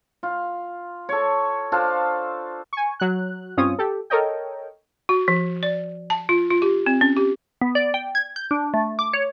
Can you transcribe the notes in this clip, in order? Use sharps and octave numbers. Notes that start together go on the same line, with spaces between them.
F4
A4 C#5
D4 F4 A4 C5
G#5 C#6
F#3 F#6
G2 C4 C#4 F4 C#5 D#6
G4 A4
A4 A#4 C#5 D#5 G5
F#4
F3
D5
A5
F4
F4
G4
C4
C#4
G4
B3
D5
G5
G#6
G6
D4
A3
D6
C#5